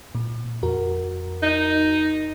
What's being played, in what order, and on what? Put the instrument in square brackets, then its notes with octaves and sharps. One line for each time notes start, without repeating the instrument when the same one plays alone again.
[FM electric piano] A#2
F2 F#4 A#4
[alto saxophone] D#4